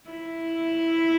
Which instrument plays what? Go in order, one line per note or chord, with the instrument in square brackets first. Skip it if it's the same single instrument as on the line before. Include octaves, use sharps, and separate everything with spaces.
[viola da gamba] E4